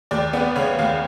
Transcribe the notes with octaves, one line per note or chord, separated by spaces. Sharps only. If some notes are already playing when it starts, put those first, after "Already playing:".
D#2 D5
B3 D5
C#3 C#5
D#2 F5